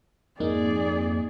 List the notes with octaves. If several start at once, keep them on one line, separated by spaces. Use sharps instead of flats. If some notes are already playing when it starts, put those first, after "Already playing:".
F2 G#2 A#3 D#4 G#4 D5